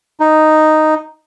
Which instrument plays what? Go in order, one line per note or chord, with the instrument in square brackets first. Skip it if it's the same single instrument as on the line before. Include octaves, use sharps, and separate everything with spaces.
[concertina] D#4